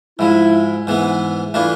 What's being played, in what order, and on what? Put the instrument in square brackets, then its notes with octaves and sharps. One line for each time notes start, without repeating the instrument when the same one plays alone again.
[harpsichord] G#2 F3 G#3 [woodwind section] E4
[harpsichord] G#2 E3 B3 E4
[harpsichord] E3 A3 D4 F4 [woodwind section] E4